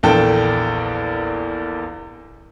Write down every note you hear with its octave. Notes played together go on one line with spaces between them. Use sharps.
A#1 E2 A#3 A4 G5 A5